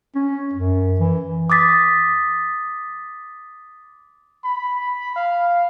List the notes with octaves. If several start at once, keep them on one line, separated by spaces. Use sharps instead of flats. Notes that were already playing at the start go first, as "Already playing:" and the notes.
C#4
F#2
E3
D6 D#6 A6 B6
B5
F5